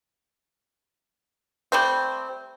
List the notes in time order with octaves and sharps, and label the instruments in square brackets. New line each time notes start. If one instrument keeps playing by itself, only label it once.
[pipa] G3 A3 C4